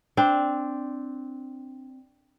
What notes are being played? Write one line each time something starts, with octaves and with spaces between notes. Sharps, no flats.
C4 D4